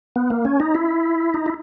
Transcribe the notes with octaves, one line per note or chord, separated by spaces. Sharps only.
B3
A#3
C#4
D#4
E4
D#4
E4